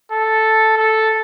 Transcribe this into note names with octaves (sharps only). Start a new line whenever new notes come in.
A4
A4